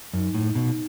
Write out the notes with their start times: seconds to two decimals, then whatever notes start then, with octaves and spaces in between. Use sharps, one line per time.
0.13 F#2 D#4
0.34 A2
0.55 B2